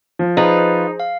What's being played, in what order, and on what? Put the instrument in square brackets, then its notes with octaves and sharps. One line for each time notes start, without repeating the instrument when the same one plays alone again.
[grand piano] F3
[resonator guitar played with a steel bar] D#4 [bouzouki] F4 B4 [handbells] G#4 C5
[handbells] F5